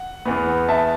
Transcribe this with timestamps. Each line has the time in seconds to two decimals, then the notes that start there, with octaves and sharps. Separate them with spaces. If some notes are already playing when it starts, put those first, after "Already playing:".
Already playing: F#5
0.25 E2 E3 B3
0.68 E5 A5